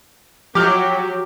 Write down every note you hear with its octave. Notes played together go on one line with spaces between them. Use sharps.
F3 F#3 G4 D6 F6